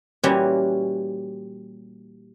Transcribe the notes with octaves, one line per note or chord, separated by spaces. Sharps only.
A#2 E3 G3 C#4 E4 F#4